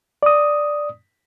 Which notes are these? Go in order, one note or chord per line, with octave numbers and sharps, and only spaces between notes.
D5 D#6